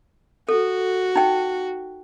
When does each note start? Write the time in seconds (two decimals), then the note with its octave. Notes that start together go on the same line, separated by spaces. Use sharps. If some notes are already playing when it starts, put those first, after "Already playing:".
0.49 F#4 A4
1.16 D#4 G5